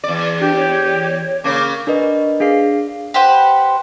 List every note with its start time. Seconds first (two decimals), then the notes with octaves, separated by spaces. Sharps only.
0.04 E2 D5
0.40 D4 G4
0.56 C#5
1.44 C#3 A#3 D6
1.87 D4 A#4 B4 D#5
2.40 D4 G#4 F5 C7
3.14 G4 B4 C5 F#5